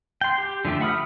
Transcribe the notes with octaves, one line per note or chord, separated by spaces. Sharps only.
G5 C6
G4
D3 F3 A3 G4
E5 F#5 B5 D#6 F6